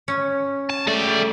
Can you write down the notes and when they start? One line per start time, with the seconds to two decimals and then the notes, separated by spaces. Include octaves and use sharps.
0.08 C#4
0.70 A5
0.87 G#3 A3 D5